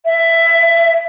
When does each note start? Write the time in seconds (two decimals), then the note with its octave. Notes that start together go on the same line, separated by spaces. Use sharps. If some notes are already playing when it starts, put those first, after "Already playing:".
0.05 E5